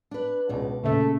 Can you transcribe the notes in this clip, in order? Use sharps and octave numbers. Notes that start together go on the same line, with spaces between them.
D4 B4
C#2 B2 D5
A#2 C#3 A3 E5